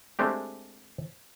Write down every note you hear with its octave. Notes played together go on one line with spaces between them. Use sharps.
G#3 A3 C4 D4 G4